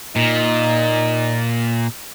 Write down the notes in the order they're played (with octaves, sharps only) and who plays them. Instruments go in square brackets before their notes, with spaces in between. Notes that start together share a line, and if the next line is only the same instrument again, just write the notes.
[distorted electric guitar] A#2 [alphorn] D#4